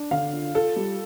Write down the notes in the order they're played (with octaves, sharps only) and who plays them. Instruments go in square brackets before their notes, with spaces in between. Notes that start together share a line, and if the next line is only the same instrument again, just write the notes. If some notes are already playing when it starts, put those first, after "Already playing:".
Already playing: [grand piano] D4
[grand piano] D3 [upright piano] F5
[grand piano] F4
[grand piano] F4 [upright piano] A4
[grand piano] G3